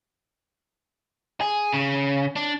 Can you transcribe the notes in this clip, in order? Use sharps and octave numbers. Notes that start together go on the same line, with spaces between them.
G#4
C#3
D4